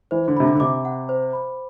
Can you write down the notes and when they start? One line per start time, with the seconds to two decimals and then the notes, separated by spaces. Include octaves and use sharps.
0.11 E3 C5
0.28 D3
0.37 C3 B5
0.44 D3
0.55 D3
0.60 C3 D6
0.85 F#5
1.09 C5
1.33 B5